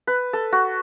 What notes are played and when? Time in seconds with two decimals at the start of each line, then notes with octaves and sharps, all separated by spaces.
0.07 B4
0.33 A4
0.52 F#4